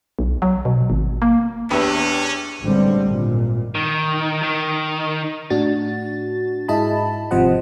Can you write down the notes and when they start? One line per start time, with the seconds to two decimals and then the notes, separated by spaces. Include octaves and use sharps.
0.19 B1
0.42 F#3
0.65 B2
0.90 G#1
1.22 A#3
1.70 E2 C#4 D4 G4 B4 E5
2.62 A1 G#2 D3 G3 C4
3.06 G#1 A#2
3.75 D#3
4.43 D#3
5.50 A2 D4 F#4 A6
6.68 G#2 E4 G#4 D#5 A5 B5
7.31 G#1 C3 F3 C5 D#5 F#5